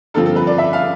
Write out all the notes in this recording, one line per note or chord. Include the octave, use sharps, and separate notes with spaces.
G2 D3 F3 C4 F4 A4
A4
B4
D5
E5
F5